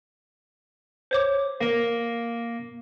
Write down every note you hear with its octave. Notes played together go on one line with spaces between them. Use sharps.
C5 C#5 D6
A#3